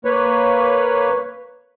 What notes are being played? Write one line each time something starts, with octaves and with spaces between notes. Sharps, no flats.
A#3 B4 C#5